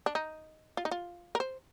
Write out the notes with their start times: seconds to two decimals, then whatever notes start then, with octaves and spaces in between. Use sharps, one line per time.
0.06 D4
0.15 D#4
0.77 F4
0.85 D#4
0.91 F4
1.35 A#4
1.40 C5